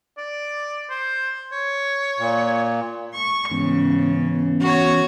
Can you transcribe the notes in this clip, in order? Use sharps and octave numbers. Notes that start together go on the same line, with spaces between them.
D5
C5
C#5
A#2
C#6
G#2 C#3 E3 B3 C#4
F#4 C#5